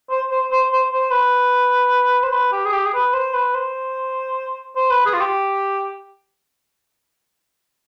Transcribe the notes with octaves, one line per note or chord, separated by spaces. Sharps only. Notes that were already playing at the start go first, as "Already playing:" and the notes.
C5
C5
C5
C5
C5
B4
C5
B4
G4
G#4
G4
G#4
B4
C5
B4
C5
C5
B4
G#4
F4
G4